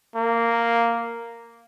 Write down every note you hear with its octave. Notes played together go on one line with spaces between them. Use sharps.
A#3